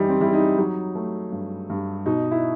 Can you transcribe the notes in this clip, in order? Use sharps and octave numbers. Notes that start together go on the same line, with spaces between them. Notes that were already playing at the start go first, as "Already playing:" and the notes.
Already playing: F#2 E3 G3 D#4 E4
C4
G3 E4
D#4
F#3 D#4
A3
G2
G2
B2 D#4
E4